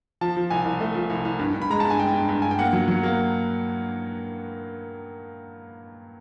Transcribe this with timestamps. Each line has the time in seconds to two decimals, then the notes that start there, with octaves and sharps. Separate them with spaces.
0.21 F3 A5
0.37 F3
0.50 C2 G#5
0.65 C2
0.80 A3
0.95 F3
1.10 C2
1.25 C2
1.39 G2
1.54 G2
1.62 B5
1.70 G#3 A#5
1.80 A5
1.85 G2
1.90 G#5
1.99 G#3 G5
2.14 G2
2.29 G2
2.42 G2 G#5
2.51 G5
2.59 A#3 F#5
2.73 F#3
2.88 F#3
3.03 A#3